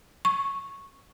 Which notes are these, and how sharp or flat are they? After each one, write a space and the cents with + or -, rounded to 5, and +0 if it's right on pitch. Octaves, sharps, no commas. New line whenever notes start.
C#6 -10